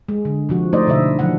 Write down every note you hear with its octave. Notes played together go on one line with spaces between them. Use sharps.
G#3
D3
C3 F3 F#4
A3 D#4 C5 D5 D#5
B2 D3 E4 D#5 E5
D#3 F3 F#3 D4 F#5